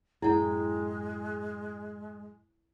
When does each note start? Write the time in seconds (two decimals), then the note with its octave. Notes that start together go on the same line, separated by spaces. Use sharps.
0.22 F#2 A2 G#3 E4 G#4 G5